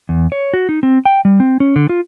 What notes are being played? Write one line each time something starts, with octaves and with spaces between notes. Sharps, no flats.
E2
C#5
F#4
D#4
C4
G5
G3
C4
C#4
D3
F4